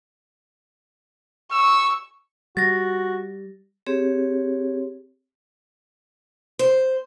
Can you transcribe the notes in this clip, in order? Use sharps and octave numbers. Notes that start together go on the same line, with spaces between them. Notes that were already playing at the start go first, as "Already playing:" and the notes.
C#6 E6
G3 F#4 A6 A#6
C4 G4 G#4 C#5
C5